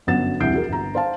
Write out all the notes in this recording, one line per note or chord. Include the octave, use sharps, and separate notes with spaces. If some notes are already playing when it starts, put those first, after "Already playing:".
G1 F#2 B3 F#5 A6 E7
E1 C2 F#5 G6 C7 D7
F#4 G#4 A#4
G1 A#5
C5 F5 A5